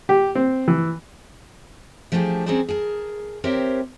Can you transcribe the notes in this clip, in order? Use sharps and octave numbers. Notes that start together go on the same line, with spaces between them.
G4
C4
E3
F3 A3 D4 D#4 G4 G#4
C4 C#4 G#4 A#4 C5 D5
G#4 A#4 G#5 A5
C4 G4 A#4 C5 C#5 E5